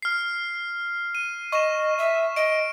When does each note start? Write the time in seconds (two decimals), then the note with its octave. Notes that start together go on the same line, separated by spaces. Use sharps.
0.02 F6 C7
1.15 D#7
1.52 D#5 C#6 E7
1.98 E5
2.36 D#5 D7